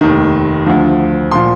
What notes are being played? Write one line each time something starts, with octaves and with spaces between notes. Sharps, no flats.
F1 D#2 D#3
D2 D3 F3
A#2 F3 C6